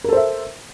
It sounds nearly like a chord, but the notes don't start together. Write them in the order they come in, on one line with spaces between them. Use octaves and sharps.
A#4 A4 C5 E5